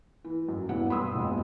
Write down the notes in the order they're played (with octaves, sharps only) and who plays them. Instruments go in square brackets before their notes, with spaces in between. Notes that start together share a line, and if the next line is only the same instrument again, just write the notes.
[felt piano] E3
F#2
E1 G2 E4 F#5
B5 C6 D#6 E6
E1 B1 F2 G#3